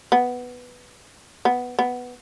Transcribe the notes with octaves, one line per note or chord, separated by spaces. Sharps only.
B3
B3
B3